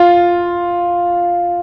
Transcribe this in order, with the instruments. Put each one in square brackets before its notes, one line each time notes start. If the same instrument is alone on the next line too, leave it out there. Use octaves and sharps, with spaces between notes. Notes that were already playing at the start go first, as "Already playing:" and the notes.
Already playing: [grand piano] F4